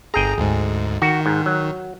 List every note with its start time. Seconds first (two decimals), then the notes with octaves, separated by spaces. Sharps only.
0.14 G1 G#4 G5 A#5
0.38 D2 G#2
1.02 D#3 F#4
1.26 G#2
1.46 F#3